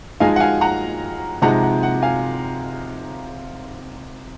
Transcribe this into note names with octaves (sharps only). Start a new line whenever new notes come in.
F3 G#3 D#4 F5 G#5
F#5
F5 G#5
F#5 A#5
C3 F3 G#3 D#4 F#5 A#5
F#5
F#5
F5 G#5